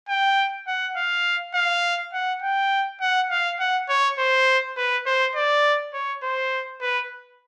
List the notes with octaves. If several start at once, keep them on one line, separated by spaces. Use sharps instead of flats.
G5
F#5
F5
F5
F#5
G5
F#5
F5
F#5
C#5
C5
B4
C5
D5
C#5
C5
B4